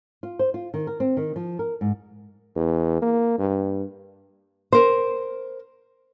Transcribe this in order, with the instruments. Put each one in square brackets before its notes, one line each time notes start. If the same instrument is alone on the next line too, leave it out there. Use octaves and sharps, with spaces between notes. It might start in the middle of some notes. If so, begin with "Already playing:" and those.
[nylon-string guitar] F4
C5
F4
D#3
A#4
C4
D#3
F3
A#4
G#2
[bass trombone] E2
A#3
G2
[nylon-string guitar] A#4 C5